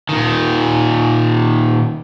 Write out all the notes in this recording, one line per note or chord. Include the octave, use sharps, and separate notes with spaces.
A#2 D#3